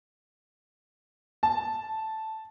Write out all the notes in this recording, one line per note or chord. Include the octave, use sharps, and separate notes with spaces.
A5